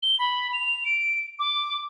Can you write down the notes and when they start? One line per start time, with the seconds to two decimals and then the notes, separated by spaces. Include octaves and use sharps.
0.03 G7
0.19 B5
0.53 F7
0.85 D7
1.39 D6